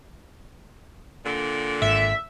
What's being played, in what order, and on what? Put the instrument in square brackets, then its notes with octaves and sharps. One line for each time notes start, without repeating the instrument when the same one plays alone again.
[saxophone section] A#2 D3
[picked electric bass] G#1 [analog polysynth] E5